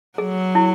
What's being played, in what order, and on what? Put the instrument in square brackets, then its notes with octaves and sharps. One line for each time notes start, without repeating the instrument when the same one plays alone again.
[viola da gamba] F#3 [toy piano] G#4
[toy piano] E4